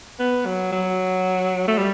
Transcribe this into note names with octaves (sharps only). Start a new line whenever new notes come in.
B3
F#3
F#3
A3
G3